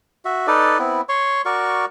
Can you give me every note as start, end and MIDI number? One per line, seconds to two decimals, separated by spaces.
0.25 0.47 66
0.25 0.47 76
0.47 0.78 63
0.47 0.78 69
0.47 0.78 71
0.47 0.78 74
0.79 1.01 59
0.79 1.01 60
0.79 1.01 64
1.09 1.42 73
1.09 1.42 84
1.09 1.42 85
1.45 1.85 66
1.45 1.85 70
1.45 1.85 74
1.45 1.85 85